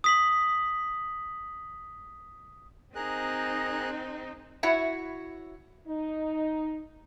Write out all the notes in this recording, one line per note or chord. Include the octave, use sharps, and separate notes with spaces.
D#6 B6 F#7
C4 D#4 G#4 A#4 F#6
E4 F#4 C#5 E5 F#5
D#4